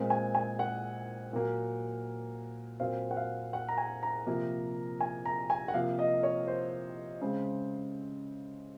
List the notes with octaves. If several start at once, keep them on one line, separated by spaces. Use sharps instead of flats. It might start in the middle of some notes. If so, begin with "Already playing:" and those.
Already playing: A#2 G#3 C4
G#5
G#5
F#5
A#2 F#3 A#3
A#2 F#3 C4 F5
F#5
F5
F#5
A#5
G#5
A#5
C3 F3 A#3
G#5
A#5
G#5
F#5
C3 F3 A#3 F5
D#5
C#5
C5
C#3 G#3 C4